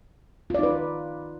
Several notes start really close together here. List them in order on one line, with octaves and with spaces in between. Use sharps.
F4 D5 D#4 B4